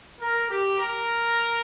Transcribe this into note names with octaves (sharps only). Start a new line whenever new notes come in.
A#4
G4
A#4